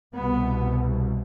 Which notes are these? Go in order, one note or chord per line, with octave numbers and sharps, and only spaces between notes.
C2 B2 B3